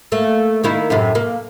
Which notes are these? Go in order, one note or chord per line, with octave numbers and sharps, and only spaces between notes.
A3 A#3
D#3 A#3 E4
F#2 A2 C3
A#3